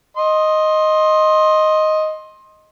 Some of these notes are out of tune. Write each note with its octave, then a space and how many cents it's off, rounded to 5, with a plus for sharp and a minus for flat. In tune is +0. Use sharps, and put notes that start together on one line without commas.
D#5 +0 C6 +20